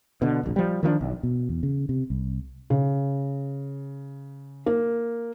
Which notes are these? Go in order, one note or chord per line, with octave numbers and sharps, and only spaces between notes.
B2 D3
D1 A#1
F3 G3
D#3 F3 A3 D4
B1
B2
E2
C#3
C3
C2
C#3
A#3